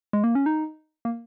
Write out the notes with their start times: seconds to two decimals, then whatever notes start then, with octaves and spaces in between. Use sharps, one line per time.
0.13 G#3
0.24 A#3
0.35 C#4
0.46 D#4
1.05 A#3